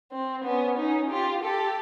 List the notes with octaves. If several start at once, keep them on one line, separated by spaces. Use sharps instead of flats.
C4
B3 C#4
C#4 D#4
F4 G4
G4 A4